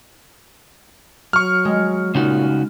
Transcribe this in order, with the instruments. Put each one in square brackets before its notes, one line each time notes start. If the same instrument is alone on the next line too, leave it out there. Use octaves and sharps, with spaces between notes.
[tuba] F#3 [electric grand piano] C#6 F6
[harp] G#3
[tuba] A#2 [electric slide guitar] C#3 D#4 F#4